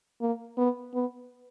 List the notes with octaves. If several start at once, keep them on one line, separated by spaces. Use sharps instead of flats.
A#3
B3
B3